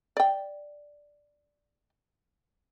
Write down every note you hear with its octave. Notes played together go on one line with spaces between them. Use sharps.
D5 G5